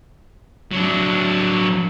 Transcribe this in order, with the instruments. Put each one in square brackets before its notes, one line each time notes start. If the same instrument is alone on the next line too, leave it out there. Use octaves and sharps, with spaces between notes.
[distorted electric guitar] F#3 D4